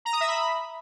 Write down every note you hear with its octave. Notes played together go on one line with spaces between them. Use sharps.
A#5
D#6
E5
B5